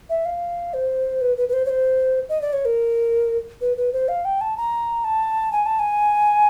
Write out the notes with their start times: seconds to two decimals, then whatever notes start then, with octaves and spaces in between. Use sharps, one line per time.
0.10 E5
0.25 F5
0.74 C5
1.21 B4
1.37 B4
1.49 B4
1.53 C5
1.65 C#5
1.69 C5
2.29 D#5
2.41 D5
2.53 C#5
2.65 A#4
3.61 B4
3.77 B4
3.93 C5
4.08 F5
4.25 G5
4.41 A5
4.57 A#5
5.04 A5
5.52 G#5
5.66 A5
5.79 G#5